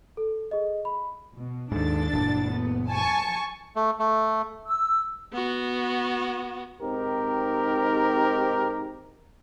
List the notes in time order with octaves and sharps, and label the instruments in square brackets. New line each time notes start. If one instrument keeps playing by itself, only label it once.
[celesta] A4
G#4 D#5
B5
[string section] B2
[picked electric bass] D#2 G#2 [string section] D4 A4 A6
[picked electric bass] F#1 E2 A#2
[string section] B3
G#5 A5 C#6
[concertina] A3
A3
[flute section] E6
[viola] B3 F#4
[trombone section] G#2 C4 D#4 G4 A#4